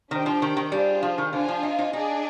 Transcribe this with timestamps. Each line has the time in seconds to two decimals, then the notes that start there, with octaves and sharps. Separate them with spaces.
0.11 D#3 D4 G4 C5 G5
0.26 F3
0.42 D#3
0.57 D#3
0.72 G3 D4 F4 G#4 C5
1.03 F3
1.18 D#3
1.32 D3 D4 F4 C5 F5 G#5
1.48 F3
1.63 D#4
1.78 D#4
1.93 D4 D#4 G#4 D5 G#5